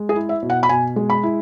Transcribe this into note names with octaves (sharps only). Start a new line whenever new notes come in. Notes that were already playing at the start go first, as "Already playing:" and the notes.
Already playing: G#3
G#4
E4
E5
B2
F#5
B5
B2 G#5
G#3
B5
E4